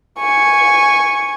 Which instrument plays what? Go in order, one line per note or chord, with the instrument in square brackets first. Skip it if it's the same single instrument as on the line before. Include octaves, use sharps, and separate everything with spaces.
[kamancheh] G#5 C#6